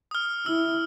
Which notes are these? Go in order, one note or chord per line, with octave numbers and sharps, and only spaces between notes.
D#6 F6
E4 E6